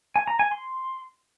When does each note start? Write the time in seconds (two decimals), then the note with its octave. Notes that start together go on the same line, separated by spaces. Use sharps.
0.16 G#5
0.28 A#5
0.39 G#5
0.51 C6